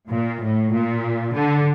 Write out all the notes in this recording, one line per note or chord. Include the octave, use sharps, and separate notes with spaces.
A#2
A2
A#2
D3